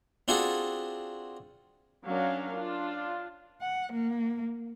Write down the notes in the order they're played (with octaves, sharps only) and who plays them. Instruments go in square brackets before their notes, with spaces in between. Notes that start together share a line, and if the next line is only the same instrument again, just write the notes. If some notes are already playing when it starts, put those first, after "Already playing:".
[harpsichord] C4 D4 F4 F#4 G#4 A4
[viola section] F#3 C#4 D4 A#4 F5
D4 F4
[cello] F#5
A#3